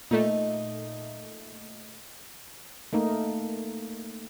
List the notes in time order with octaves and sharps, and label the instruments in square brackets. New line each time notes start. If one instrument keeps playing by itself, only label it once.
[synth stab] A#2 A3 [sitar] D#4
[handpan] A3 A#3 D#4